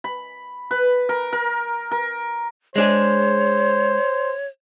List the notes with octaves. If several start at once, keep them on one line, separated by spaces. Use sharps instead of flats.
B5
B4
A#4
A#4
A#4
G#3 D4 G#4 C5 C#5